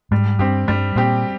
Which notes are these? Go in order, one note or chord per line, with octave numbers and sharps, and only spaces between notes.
G#2 G3
G2 C4 G4
G2 G3
A#2 C4 G4